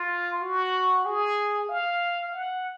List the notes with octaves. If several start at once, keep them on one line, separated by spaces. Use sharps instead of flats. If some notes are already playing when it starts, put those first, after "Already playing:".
Already playing: F4
F#4
G#4
F5
F#5